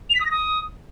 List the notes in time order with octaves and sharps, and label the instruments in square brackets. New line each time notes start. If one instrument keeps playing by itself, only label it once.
[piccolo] F7
B6
D#6
A#6
D#6